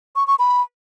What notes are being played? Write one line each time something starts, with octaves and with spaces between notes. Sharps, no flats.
C#6
C#6
B5